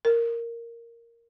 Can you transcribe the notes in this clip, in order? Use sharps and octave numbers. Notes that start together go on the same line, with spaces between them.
A#4